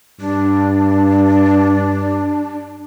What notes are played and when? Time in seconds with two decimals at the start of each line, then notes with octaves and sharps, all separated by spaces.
0.20 G2 D4